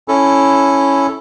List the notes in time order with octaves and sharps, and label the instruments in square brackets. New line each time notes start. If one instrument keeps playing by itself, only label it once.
[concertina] C#4 E4 A4